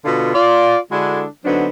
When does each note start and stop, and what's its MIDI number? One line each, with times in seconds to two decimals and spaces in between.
0.05 0.30 47
0.05 0.30 50
0.05 0.30 59
0.05 0.30 65
0.34 0.77 65
0.34 0.77 74
0.92 1.24 50
0.92 1.24 56
0.92 1.24 62
0.92 1.24 64
0.92 1.24 66
0.92 1.24 69
1.45 1.68 50
1.45 1.68 54
1.45 1.68 59
1.45 1.68 60
1.45 1.68 62
1.45 1.68 63